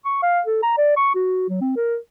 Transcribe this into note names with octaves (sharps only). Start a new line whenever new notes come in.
C#6
F5
A4
A#5
D5
C#6
F#4
F#3
C4
A#4